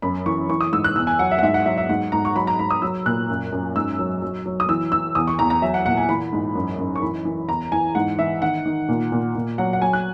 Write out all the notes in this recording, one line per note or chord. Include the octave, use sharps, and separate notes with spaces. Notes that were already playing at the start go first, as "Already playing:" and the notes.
F#2 B5
E3 C#6
E3 C#6
D#6
G#2 E6
F#6
E2 E6
G#5
F#3 F#5
E5
F#5
G#2 E5
F#5
F#3 E5
E5
G#2 F#5
G#2 A#5
C#6
F#3 B5
A#5
G#2 B5
D#6
F#3 E6
A#2 F#6
F#2
F#2
G#2 E6
F#3
F#3
F#3
D#6
E3 E6
E3 E6
E2 D#6
C#6
E2 A#5
A#5
F#3 E5
F#5
A#2 F#5
G#5
E3 B5
G#2
F#2
F#2
C#6
E3 B5
E3
E2 A#5
E3 G#5
G#2 F#5
E3 E5
D#3 F#5
D#3
A#2
A#2
A#2
F#3 F#5
F#5
F#3 G#5
F#6